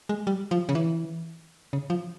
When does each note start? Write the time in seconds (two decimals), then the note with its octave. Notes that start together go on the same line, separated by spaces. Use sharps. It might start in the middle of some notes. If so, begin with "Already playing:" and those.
0.09 G#3
0.27 G3
0.51 F3
0.69 C#3
0.75 E3
1.73 C#3
1.90 F3